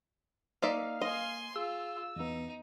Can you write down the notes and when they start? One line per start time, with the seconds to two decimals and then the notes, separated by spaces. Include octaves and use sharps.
0.62 A#3 D#4 D5 E5 F5
1.02 D#5 G#5 C6
1.56 F4 G#4 E6
2.16 E2 B3 D#4